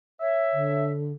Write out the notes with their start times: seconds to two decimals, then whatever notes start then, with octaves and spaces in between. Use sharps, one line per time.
0.20 C#5 E5
0.53 D3